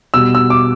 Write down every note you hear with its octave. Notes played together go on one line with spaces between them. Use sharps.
B2 G3 E6
E6
D6